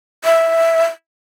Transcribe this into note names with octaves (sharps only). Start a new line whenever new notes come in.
E5